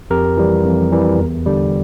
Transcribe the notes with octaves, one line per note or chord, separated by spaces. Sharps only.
F2 G4 A#4
E3 G3
F2
E3 G3
E2
D3 G3